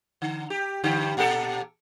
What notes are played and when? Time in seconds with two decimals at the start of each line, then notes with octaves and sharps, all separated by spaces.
0.22 D3
0.50 G4
0.84 G2 D3 G4
1.17 A#2 G4 A4